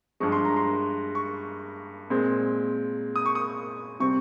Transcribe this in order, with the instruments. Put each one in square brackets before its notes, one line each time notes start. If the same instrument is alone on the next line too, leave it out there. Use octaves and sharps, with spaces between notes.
[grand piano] G2 F3 G#3 C#6
C6
A#5
C6
C#6
A#2 G#3 C4
D#6
C#6
D#6
C3 G3 C4 C#6